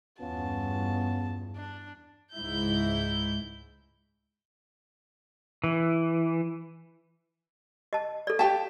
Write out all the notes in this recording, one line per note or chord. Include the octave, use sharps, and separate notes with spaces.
E2 G2 B3 C#4 F4 A5
D4
C#2 G#2 E4 G6
E3
D#5 A5
A4 D5
G4 F5 G5 A5